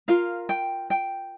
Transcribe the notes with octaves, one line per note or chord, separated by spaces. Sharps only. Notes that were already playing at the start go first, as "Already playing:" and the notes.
F4 A#4 F5
G5
G5